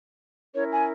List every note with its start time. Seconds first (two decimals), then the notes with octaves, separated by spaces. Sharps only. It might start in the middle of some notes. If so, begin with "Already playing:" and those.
0.54 C#4 E4 A#4 C#5
0.72 G#5